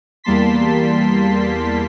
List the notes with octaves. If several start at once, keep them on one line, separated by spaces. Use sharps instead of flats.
E2 G3 A#3 A5 C6 B6